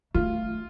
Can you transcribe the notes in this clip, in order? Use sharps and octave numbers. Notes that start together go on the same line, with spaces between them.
A3 F4